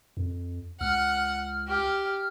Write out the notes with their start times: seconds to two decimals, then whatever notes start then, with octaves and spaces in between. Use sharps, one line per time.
0.17 F2
0.81 C#2 F#5 F6
1.68 G4